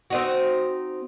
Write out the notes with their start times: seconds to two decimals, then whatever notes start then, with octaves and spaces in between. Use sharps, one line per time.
0.10 C4 D#4 F#4